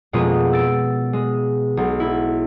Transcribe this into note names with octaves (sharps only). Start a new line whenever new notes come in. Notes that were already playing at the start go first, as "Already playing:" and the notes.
F2 B2 G#3 A#3 C#4 F4
E6 A6 D7
G#3
B1
E4